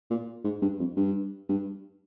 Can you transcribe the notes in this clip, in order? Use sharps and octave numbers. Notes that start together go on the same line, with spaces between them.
A#2
G#2
G2
F2
G2
G2